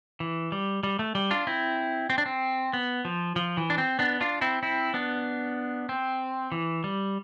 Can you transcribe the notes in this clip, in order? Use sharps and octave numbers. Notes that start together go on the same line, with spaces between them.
E3
G3
G3
A3
G3
D4 F4
C4 E4
C4
D4
C4
B3
F3
F3
E3
D4
C4
B3 D4
D4 F4
C4 E4
C4 E4
B3 D4
C4
E3
G3